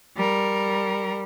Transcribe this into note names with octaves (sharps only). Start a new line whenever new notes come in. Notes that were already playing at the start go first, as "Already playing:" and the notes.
G3 A#4